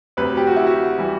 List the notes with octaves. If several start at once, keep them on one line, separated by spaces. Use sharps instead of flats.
D2 C3 F#3 B4
G4
F#4
E4
F#4
E3 G3